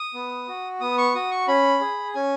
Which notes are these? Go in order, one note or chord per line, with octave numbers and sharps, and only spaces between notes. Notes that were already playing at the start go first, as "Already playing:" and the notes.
Already playing: D#6
B3
F#4
B3 D#6
C#6
F#4 D#6
C#6
C#4 B5
G#4
C#4 G#5